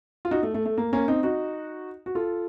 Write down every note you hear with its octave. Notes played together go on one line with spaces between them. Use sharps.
F4
D#4 F#4
A3
A3
A3
A#3
A#3 C#4
C4 D#4
D#4 F#4
F#4
F4 A4